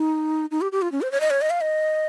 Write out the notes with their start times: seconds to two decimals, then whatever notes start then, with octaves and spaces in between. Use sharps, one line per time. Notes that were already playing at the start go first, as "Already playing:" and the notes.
Already playing: D#4
0.51 D#4
0.61 G4
0.72 G4
0.82 F4
0.92 C#4
1.02 C5
1.12 C#5
1.21 D#5
1.30 C#5
1.42 D#5
1.50 F5
1.61 D#5